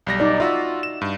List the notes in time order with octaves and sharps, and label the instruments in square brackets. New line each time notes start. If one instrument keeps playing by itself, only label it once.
[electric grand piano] B1 G3 A#6
[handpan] D#4 D5
[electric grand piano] F4 F#4 [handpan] E5
[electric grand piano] E7
G2